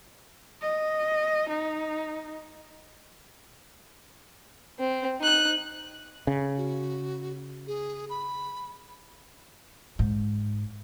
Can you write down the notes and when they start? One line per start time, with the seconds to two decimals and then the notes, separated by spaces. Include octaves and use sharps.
0.62 D#5
1.49 D#4
4.79 C4
5.20 D#4 F#6
6.27 C#3
6.57 F#4
7.67 G#4
8.10 B5
9.99 G#2